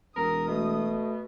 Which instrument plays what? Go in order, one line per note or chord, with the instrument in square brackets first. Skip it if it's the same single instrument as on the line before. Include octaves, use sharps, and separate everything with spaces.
[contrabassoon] E1 [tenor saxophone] A#4 [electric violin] D#6
[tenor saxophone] B2 [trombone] A3